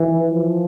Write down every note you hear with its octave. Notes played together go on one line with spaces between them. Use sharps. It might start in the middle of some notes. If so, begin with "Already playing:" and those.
Already playing: E3
F3